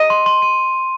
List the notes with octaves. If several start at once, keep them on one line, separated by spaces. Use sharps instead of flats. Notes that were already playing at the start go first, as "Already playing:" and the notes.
Already playing: D#5 D#7
C6
C6
D#7